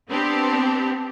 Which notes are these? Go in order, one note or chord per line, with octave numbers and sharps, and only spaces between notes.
B3 C4 D4 G4